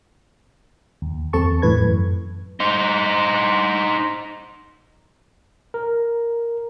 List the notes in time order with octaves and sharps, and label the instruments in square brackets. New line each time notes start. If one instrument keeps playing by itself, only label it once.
[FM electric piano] D#2
E2 C4 A4 A5 C#6
A2 E3 B4 G#6
F#2
[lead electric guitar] D#4 C5
[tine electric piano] A#4